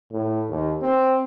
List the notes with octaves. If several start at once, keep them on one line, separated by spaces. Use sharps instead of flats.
A2
D#2
C4